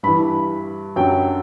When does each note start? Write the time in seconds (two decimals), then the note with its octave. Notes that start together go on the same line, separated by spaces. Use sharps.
0.03 G2 E3 B5
0.96 F#2 D3 F#3 G5